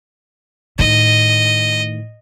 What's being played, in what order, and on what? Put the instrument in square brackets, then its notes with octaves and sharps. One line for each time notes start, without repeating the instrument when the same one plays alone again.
[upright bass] A2 D#3 [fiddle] D#5